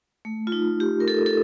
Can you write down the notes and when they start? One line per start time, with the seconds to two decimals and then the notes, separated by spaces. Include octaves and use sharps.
0.25 A3
0.47 F4
0.52 D#4
0.80 G4
1.00 A#4
1.08 A4
1.26 A4